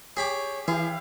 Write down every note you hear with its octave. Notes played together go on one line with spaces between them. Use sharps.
G4 G#4 C#5 B5 D6
E3 E4 G4 G#4 F5